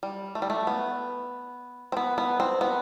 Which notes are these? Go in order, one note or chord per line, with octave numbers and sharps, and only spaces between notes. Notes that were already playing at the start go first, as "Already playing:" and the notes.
G3
A3
G3
A3
B3
C4
B3
B3
C4
B3